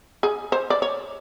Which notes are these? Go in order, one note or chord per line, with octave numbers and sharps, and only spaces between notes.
G#4
C5
D5
C#5